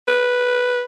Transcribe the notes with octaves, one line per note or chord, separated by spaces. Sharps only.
B4